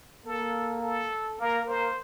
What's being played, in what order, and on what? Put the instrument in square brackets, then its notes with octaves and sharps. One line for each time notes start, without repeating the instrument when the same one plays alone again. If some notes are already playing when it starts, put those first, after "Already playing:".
[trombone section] A#3 [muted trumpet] A4
[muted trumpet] A4
[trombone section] A#3 [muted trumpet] A#4
[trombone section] A#3 [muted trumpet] C5